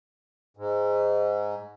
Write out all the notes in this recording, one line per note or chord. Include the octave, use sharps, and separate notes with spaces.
G#2